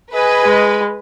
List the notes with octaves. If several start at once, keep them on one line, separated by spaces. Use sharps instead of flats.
G#4 B4 D#5 G#5
G#3